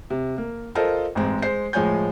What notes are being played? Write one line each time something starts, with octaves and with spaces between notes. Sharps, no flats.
C3
A#3
F4 A4 A#4 C5 D#5
A1 G#2 G#3 C4
G#3 C5 C7
A2 F3 G#3 C#5 G#5 G6